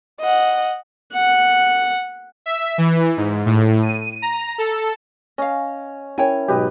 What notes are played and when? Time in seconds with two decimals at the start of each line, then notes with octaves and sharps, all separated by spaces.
0.20 D#5 F#5
1.13 F#5
2.46 E5
2.78 E3
3.17 G#2
3.46 A2
3.83 D#7
4.22 A#5
4.58 A4
5.38 C#4 D#5 F5
6.18 C#4 E4 A#4 C#5 G5 G#5
6.48 G#2 B2 F#3 G4 B4 D#5